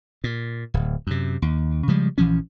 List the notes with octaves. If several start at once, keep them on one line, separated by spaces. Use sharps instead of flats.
A#2
D1
F#2 C3
D#2
C#3 F3 G3 G#3
A#1 E3 F3 C#4